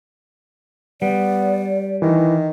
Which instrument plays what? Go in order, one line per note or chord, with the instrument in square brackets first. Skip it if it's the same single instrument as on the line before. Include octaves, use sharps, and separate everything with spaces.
[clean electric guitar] G3 [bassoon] B3 [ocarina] D5
[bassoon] D#3 [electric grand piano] E3